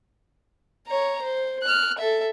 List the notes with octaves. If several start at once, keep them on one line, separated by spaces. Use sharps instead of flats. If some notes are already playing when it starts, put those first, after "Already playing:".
C#5 A#5
C5
F6 F#6
A4 E5